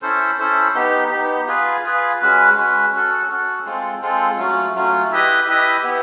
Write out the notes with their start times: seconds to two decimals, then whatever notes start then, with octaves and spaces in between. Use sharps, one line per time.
0.02 C#4 E4 A4 C5
0.39 C#4 E4 A4 C5
0.75 B3 D#4 G4
1.11 B3 D#4 G4
1.48 F4 G#4 B4
1.84 F4 G#4 B4
2.20 G#3 C#4 F#4 B4
2.57 G#3 C#4 F#4 B4
2.93 C#4 F#4 A4
3.30 C#4 F#4 A4
3.65 G#3 C4 F4 A4
4.02 G#3 C4 F4 A4
4.38 F#3 A3 C#4 F4
4.75 F#3 A3 C#4 F4
5.11 E4 G4 B4 D#5
5.48 E4 G4 B4 D#5
5.84 B3 E4 G4